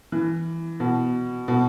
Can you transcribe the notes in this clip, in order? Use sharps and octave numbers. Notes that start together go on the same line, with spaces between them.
E3
B2
B2